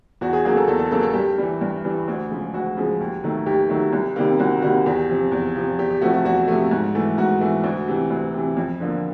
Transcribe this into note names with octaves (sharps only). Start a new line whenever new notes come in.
E2 F#4
G#4
C#3 F#3 A#3 G#4
A4
E2 A4
A4
C#3 F#3 A#3 A4
A4
G2 G4
E3 G3
G2
E3 G3
D2
C#3 F3 G#3
D2 F#4
C#3 F3 G#3
D#2
D#3 F#3 A3
D#2 G4
D#3 F#3 A3
C2
C3 D#3 G3 A#3
C2 F#4
C3 D#3 G3 A#3 F#4
E2 G4
C3 F3
E2
C3 F3
E2 G4
G4
C3 F3 A3 F#4
F#4
E2 F#4
C3 F3 A3
G#2
E3 A3
G#2 F#4
E3 A3
D2
C3 E3
D2
C3 E3
F2
D3 F3 A#3